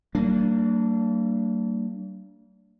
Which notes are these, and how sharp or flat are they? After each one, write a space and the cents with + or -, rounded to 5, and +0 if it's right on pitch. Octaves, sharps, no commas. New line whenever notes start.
G3 -40 A#3 -30 D4 +0